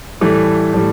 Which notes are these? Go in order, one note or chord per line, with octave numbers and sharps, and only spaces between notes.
A2 E3 G3 A3
A2 E3 G3